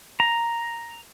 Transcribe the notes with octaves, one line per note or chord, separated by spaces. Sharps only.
A#5